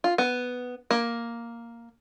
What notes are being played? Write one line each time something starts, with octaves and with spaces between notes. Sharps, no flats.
F4
B3
A#3